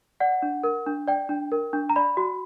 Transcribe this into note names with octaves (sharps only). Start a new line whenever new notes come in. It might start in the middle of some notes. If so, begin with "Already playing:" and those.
D5 F#5
D4
A#4
D4
D5 G5
D4
A#4
D4
A#5
D5 B5
F#4